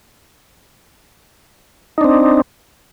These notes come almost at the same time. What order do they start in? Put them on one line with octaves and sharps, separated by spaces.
D#4 D4 C4